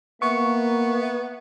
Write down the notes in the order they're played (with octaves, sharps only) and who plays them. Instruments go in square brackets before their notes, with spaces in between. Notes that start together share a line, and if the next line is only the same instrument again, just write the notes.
[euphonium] A#3 [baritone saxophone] B3 [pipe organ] E5 [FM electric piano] C#6